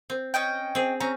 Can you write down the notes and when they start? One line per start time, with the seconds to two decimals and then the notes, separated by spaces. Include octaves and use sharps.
0.10 C4
0.34 C#4 D#5 G5
0.75 C4 G#4
1.00 C4 C#4 A#5